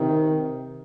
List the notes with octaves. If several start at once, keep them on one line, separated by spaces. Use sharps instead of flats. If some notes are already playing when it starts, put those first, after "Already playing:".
Already playing: C3 D#3